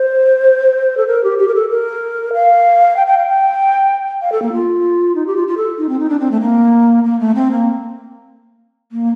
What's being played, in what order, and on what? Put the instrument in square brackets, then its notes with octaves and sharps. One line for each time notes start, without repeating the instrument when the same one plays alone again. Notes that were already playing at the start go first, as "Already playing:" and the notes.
Already playing: [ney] C5
A4
A#4
G4
G4
A#4
A4
A#4
F5
G5
G5
F5
G5
F5
A4
A#3
F4
D#4
G4
F4
F4
A4
D#4
C4
D#4
D4
C4
A3
A#3
A#3
A3
C4
A#3
A#3